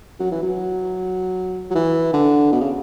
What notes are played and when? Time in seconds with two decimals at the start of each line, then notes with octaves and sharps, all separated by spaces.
0.20 F#3
0.31 E3
0.43 F#3
1.71 F#3
1.75 E3
2.13 D3
2.52 B2
2.60 C#3